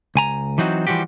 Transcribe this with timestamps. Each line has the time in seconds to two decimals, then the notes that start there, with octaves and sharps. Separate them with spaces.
0.15 C#2 G#5 A#5
0.58 E3 F#3 C4 D#4 F#4
0.87 E3 F3 G3 F#4 G4